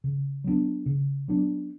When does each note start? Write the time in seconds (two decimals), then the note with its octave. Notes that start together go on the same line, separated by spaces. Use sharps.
0.04 C#3
0.44 F#3 B3 D4
0.86 C#3
1.28 F#3 B3 D4